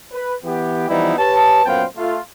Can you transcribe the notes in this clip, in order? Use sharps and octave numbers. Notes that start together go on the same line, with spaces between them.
B4
E3 B3 G4
E3 F3 G3 B3 D#4 E4
G4 B4 C#5 A5
F#2 A#2 B3 C5 F5 G5
A3 F4